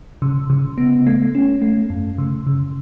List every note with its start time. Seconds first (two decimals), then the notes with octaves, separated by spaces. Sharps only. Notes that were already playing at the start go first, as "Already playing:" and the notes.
0.22 C#3
0.50 C#3
0.78 B3
1.07 A3
1.35 C#4
1.62 A3
1.90 F#2
2.18 C#3
2.47 C#3